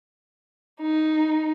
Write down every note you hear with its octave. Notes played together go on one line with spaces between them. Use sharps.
D#4